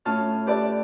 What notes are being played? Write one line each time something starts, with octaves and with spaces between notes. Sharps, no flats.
A2 C#4 F4 A5 F6
G4 B4 D5 E5 A5